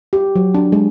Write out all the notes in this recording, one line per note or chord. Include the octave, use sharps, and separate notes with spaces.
G4
F#3
D4
G#3